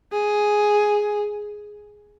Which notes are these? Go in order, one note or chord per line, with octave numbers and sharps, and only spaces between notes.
G#4